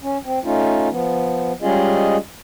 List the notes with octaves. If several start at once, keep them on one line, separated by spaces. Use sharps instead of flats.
C#4
C4
A3 C#4 D#4 F4
F3 B3
G3 G#3 C#4 F4 G#4 D#5